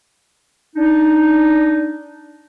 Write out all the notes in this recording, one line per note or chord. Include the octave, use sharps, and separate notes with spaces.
D4 D#4